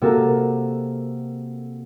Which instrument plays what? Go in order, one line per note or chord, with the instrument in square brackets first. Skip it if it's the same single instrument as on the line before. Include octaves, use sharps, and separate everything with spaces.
[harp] C3 A#3 F#4 A4 A#4